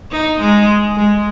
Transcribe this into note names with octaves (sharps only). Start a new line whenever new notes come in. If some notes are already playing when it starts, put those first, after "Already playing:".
D#4
G#3
G#3